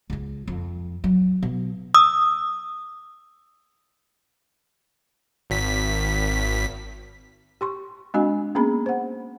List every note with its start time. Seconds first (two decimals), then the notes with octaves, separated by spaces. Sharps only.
0.10 C#2 C#3
0.48 F2
1.04 F#3
1.43 B2
1.95 D#6 E6
5.50 G#1 B6
7.61 G4 C6 C#6
8.14 G#3 C4 D4 F#4 D#5 G#5
8.55 A#3 B3 C#4 G#4 B5
8.86 C5 F#5